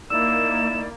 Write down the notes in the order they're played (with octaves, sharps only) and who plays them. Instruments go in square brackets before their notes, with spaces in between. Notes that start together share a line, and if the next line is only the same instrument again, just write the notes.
[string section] A#3 [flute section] D#4 E4 D5 [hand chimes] E6 [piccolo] E7